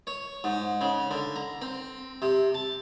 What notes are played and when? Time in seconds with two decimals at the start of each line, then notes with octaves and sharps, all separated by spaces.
0.07 C#5
0.44 G#2
0.81 C#3
1.11 D3
1.36 A#5
1.61 C4
2.22 C3
2.54 A5